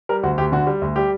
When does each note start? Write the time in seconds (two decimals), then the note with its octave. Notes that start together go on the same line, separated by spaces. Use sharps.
0.09 G3 A#4
0.23 D2 F#4
0.38 D2 G4
0.52 D3 F#4
0.67 G3
0.82 D2
0.96 G3 G4